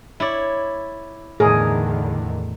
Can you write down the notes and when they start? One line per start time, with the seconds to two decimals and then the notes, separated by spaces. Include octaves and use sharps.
0.20 E4 C#5 D5
1.40 E2 A2 D3 D#3 G#4 A#4